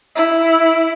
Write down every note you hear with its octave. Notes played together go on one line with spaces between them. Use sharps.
E4